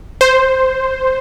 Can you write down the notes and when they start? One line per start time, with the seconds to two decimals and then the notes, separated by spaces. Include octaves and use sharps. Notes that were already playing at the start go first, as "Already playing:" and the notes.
0.21 C5